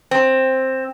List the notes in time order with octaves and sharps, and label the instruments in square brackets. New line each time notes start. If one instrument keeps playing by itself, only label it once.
[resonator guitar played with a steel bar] C4